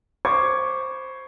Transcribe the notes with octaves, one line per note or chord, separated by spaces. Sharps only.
C5 B5 C#6 D6 G#6